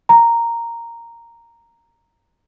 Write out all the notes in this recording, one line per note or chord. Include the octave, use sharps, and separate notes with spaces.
A#5